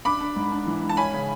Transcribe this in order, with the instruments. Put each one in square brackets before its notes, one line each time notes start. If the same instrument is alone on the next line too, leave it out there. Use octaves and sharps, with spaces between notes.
[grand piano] D4 [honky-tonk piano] B5 D6
[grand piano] D4
G#2
D4
E3
G#2
[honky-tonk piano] A5
[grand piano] C#4 [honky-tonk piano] G#5 B5
[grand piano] C#3